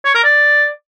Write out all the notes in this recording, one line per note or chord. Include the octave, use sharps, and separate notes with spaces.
C#5
A#4
D5